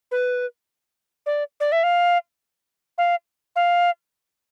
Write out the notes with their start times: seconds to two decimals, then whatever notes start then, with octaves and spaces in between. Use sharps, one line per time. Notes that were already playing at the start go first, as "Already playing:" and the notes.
0.11 B4
1.26 D5
1.60 D5
1.72 E5
1.83 F5
2.98 F5
3.56 F5